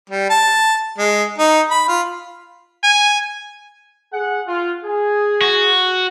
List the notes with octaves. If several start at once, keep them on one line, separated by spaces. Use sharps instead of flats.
G3
A5
G#3
D#4
B5
F4
G#5
G#4 F#5
F4
G#4
F#4